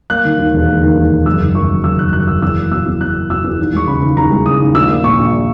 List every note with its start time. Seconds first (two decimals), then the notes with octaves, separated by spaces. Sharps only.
0.10 A#3 F#6
0.25 D#3
0.39 D#2
0.54 E1
0.68 A#3
0.83 D#3
0.97 D#2
1.12 E1
1.26 F#1 E6
1.41 D#3
1.55 F#2 C#6
1.69 F#1
1.84 F#1 E6
1.99 D#3 F#6
2.13 F#2 F#6
2.27 F#1 E6
2.42 E2 E6
2.57 A#3
2.72 B2 E6
2.86 E2
3.01 E2 F#6
3.15 A#3
3.30 B2 E6
3.44 E2
3.59 D#2
3.73 G#3 C#6
3.87 C#3 B5
4.02 D#2
4.17 D#2 A#5
4.31 G#3
4.46 C#3 D#6
4.60 D#2
4.75 A#1 E6
4.90 A#3
5.04 A#2 C#6
5.18 A#1